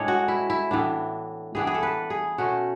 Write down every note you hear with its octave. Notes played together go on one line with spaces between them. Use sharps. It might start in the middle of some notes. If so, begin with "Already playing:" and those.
Already playing: A2 G#3 D4 C#5
F#4
E4
E4
A2 E3 B3 D4
A2 E3 B3 D4 G#4
G#4
A4
B4
G#4
B2 A3 C#4 F#4